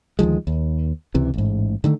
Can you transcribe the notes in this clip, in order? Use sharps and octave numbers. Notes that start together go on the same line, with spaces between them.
D2 D#3 F3 G#3
D#2
C#2 C3 E3
A1 G#2
D3 D#3 A3